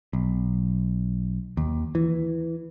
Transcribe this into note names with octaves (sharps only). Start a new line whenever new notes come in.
B1
D#2
E3